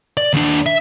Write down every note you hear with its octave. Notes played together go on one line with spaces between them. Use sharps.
D5
D#2 D4
E5